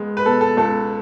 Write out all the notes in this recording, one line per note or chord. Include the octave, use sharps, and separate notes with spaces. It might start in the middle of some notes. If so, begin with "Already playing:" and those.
Already playing: C#2 G#3 B3
B4
B2 A4
A4
C#2 A4